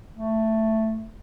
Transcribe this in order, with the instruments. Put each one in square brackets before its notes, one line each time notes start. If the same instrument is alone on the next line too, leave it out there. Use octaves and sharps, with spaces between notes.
[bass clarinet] A3